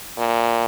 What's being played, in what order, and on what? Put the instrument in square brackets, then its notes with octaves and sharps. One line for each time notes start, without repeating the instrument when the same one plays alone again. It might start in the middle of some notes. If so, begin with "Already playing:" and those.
[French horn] A#2